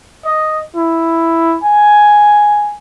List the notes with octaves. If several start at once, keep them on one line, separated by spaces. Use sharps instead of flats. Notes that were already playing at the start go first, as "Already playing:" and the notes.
D#5
E4
G#5